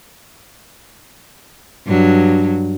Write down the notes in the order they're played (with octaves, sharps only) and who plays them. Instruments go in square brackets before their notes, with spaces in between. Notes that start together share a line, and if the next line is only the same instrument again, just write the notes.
[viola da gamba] G2 F#3